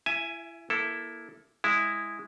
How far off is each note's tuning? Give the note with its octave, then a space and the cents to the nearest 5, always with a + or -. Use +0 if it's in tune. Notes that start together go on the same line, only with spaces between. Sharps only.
E4 +30 E5 +0 G#5 +0
A#3 +20 E4 +0 A4 +0
G#3 -10 E4 +0